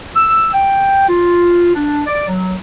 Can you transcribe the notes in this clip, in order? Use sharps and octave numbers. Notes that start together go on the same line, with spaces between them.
E6
G5
F4
D4
D5
F#3